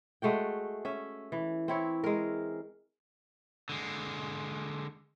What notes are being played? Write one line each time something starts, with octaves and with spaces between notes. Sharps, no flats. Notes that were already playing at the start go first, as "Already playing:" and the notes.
G#3 A3 F#4 G5
C#4 E5
E3
C4 E4 C#5
G#3 A#4
D3 G#3